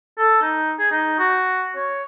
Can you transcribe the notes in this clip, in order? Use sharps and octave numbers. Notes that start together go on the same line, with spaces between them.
A4
D#4
G#4
D#4
F#4
C#5